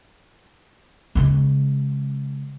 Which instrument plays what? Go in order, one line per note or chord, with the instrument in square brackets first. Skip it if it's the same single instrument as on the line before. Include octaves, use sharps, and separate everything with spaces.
[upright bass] C#3 G#3